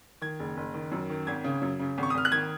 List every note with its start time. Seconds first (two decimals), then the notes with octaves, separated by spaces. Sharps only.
0.21 D#3 G#6
0.39 F#1
0.57 F#1
0.74 D#3
0.91 F#2
1.10 D#3
1.27 G#1 G#6
1.44 C#3
1.61 F#2
1.80 C#3
1.98 G#1
2.03 C#6
2.10 D#6
2.14 G#1 F6
2.25 F#6
2.32 D#3 G#6